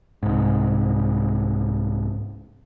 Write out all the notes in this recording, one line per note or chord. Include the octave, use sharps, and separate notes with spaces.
C2 G#2